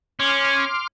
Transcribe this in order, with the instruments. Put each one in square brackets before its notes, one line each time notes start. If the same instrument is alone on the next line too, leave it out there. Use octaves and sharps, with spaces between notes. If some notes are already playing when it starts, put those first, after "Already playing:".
[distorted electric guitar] C#4 [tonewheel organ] C6 D6 F6